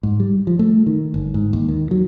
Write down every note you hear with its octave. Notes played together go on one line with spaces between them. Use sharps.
G#2
G3
F3
A3
D#3
G1
G#2
D#2
D#3
F#3